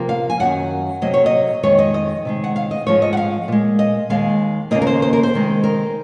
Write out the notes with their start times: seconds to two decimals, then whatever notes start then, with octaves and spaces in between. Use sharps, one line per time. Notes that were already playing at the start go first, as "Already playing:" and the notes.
Already playing: C3 F3 A#3
0.09 F5
0.30 G#5
0.40 F#2 D#3 F#3 F#5
1.01 C3 F#3 A#3 D#5
1.14 C#5
1.26 D#5
1.63 F2 D#3 G#3 C#5
1.79 D#5
1.94 D#5
2.25 C3 D#3 G#3
2.44 F#5
2.56 F5
2.71 D#5
2.86 G#2 F3 G#3 C#5
3.02 D#5
3.13 F#5
3.17 F5
3.48 A#2 G#3
3.79 D#5
4.10 D#2 D#3 G#3 F5
4.71 D#2 C#3 F#3 A#3 D#5
4.82 A#4
4.87 C5
5.02 C5
5.13 A#4
5.23 C5
5.33 C3 D#3 G#3
5.64 A#4